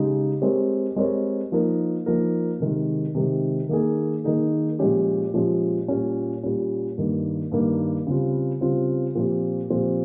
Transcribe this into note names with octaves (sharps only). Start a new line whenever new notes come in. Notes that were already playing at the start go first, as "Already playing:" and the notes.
Already playing: C#3 G#3 D#4 G4
G#3 C4 G4 A#4 C#5
G#3 C4 G4 A#4 C#5
F3 A#3 D#4 A#4
F3 A#3 D#4 A#4
C3 D#3 G#3
C3 D#3 G#3
D#3 A#3 D#4 G#4
D#3 A#3 D#4 G#4
A#2 F3 G#3 C#4 G4
A#2 F3 G#3 C#4 G4
A#2 G3 C#4
A#2 G3 C#4
G2 D#3 A#3
G2 D#3 A#3
C#3 G3 C4 F4
C#3 G3 C4 F4
A#2 F3 C4 G4 C5
A#2 F3 C4 G4 C5